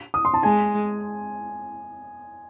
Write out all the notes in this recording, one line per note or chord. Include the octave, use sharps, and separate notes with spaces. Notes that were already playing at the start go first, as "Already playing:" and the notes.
D#6
C6
A5
G#3 G#5